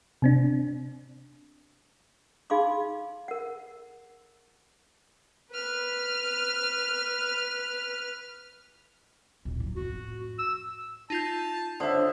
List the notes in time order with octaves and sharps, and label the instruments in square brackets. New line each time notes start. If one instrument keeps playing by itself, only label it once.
[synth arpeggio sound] C3 C4 D4
[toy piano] D#4 G#4 F5 B5 C6 D6
A#4 F#5
[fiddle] B4 F6
[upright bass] D1 A#1
E3 F#3
[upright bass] F2 A2 [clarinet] F#4
[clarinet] E6
[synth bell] D#4 F4 G6 [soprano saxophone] A5
[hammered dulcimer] D3 E5 [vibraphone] D4 C5 D#6